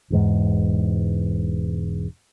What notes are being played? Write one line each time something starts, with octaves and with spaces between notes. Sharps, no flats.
E1 E2 G#2